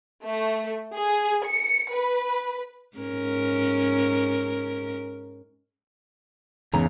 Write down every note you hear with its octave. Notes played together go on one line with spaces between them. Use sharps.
A3
G#4
C#7
B4
G#2 C#4 A#4
E2 G#2 C#3 A#5